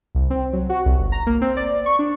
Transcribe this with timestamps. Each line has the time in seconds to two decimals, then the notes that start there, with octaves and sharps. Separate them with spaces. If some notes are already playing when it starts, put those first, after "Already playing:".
0.15 C2
0.30 C4
0.53 F#3
0.69 F#4
0.86 C2
0.99 G1
1.12 A#5
1.27 A#3
1.41 C4
1.57 D5
1.86 C#6
1.99 D4